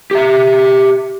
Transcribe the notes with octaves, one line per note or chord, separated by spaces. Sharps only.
G4 E5